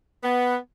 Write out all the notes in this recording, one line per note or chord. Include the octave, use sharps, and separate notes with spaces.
B3